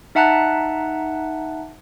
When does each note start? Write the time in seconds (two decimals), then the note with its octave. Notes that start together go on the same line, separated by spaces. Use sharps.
0.15 D#4 E5 F#5 A5 A#5 F#6